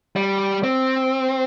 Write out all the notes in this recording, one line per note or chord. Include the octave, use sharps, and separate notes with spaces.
G3
C4